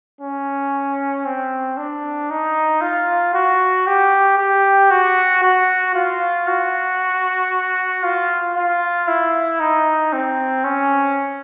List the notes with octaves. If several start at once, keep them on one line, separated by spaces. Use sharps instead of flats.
C#4
C4
D4
D#4
F4
F#4
G4
G4
F#4
F#4
F4
F#4
F4
F4
E4
D#4
C4
C#4